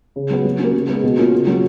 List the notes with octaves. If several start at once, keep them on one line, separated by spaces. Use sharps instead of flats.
C#3
F#3 B3 F#4
F#3
A#3 C#4
C#3
G#3 B3
B2
A#3 C#4 F4
C#3
F#3 A#3 C#4 F4